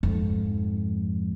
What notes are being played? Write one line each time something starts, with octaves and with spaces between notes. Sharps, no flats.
F2 G#2